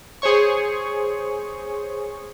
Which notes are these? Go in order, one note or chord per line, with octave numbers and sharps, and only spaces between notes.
G#4 C5 C#5 C#6